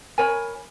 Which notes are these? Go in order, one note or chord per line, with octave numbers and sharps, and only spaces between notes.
A#4 C#5 G#5 B5